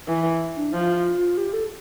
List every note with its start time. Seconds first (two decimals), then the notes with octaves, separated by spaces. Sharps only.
0.08 E3
0.56 D4
0.73 F3 F4
1.37 G4
1.53 A4